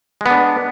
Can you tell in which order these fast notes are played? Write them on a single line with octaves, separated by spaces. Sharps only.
G#3 B3 D4